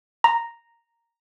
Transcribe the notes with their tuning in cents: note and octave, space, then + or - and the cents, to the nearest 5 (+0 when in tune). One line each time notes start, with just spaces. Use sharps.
A#5 -5